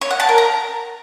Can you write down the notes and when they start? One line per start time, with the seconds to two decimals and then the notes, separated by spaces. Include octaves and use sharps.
0.01 C#5
0.11 F#5
0.20 A5
0.29 A#4
0.38 A#5